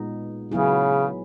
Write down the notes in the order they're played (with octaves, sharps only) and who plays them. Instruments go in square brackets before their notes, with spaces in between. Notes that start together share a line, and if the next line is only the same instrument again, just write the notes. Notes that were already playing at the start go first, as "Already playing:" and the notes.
Already playing: [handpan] A#2 G#3 B3 D#4
[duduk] C#3 [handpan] F#3 B3 E4 G#4